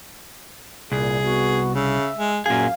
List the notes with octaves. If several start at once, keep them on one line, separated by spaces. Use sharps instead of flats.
C2 A#2 G#4
B3 F#4
C#3 E5
G#3
F#2 A#2 G#4 F5